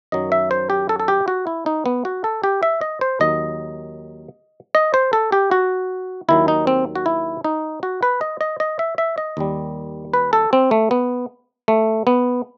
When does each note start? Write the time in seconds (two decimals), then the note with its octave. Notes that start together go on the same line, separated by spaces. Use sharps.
0.12 F#2 D#3 F#3 D#5
0.32 E5
0.51 C5
0.70 G4
0.89 A4
1.00 A4
1.08 G4
1.28 F#4
1.47 E4
1.66 D#4
1.86 B3
2.05 F#4
2.24 A4
2.44 G4
2.63 E5
2.81 D#5
3.01 C5
3.20 D#2 D#3 F#3 D#5
4.75 D#5
4.94 C5
5.13 A4
5.32 G4
5.51 F#4
6.28 D#2 D#3 F#3 E4
6.48 D#4
6.67 C4
6.95 F#4
7.06 E4
7.44 D#4
7.83 F#4
8.03 B4
8.21 D#5
8.41 D#5
8.60 D#5
8.79 E5
8.98 E5
9.18 D#5
9.37 D#2 D#3 G3
10.14 B4
10.33 A4
10.53 C4
10.71 A3
10.91 B3
11.68 A3
12.07 B3